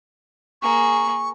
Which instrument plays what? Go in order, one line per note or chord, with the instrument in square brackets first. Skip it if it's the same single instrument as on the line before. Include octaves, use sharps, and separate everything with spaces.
[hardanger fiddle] A#3 G#4 [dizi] C#6